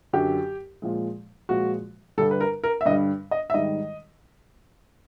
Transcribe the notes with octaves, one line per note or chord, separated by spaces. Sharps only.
F#2 D3 F#3 G4
A#2 F3 G#3
A#2 F3 G#3 F#4
G2 D3 G3 A4
B4
A#4
A#4
E5
G2 D3 G3 D#5
D#5
E5
G#2 D#3 G3 D#5